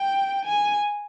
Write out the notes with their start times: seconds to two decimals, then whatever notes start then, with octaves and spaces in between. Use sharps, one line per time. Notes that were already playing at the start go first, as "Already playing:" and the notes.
Already playing: G5
0.45 G#5